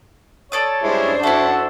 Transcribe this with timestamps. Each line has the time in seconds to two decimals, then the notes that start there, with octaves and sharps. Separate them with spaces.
0.52 A4 C#5 D5 D#6
0.82 F#2 G3 G#3 D4 E4 C5
1.23 E4 F#4 A4 E5 F#5